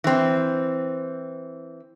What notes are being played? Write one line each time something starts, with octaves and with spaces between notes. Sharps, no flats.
E3 C4